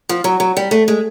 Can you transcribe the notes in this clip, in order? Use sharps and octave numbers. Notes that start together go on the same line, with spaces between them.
F3
F#3
F#3
G3
A3
G#3